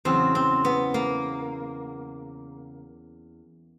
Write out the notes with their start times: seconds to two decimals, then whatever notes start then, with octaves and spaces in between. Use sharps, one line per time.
0.05 E2 C#3 F#3 C4
0.35 C4
0.65 B3
0.94 A#3